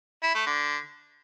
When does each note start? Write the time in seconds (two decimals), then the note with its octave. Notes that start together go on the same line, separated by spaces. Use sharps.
0.23 E4
0.35 A3
0.46 D3